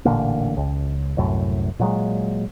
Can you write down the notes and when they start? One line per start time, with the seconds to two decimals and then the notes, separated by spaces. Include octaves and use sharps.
0.05 A1 A#2 D3 A#3
0.57 C#2
1.17 C2 F#2 A2
1.80 A#2 F#3 G#3